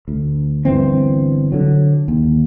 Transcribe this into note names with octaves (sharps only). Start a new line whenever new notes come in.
D2
G1 G2 E3 C4
D3 F#3
D#2